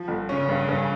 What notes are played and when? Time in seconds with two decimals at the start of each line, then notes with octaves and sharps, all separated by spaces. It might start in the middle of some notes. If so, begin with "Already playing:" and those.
Already playing: F3
0.08 G1
0.29 C#3 C#4
0.49 G2
0.69 G2